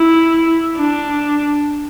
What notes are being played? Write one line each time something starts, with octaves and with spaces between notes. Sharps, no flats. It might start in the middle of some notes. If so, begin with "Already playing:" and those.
Already playing: E4
D4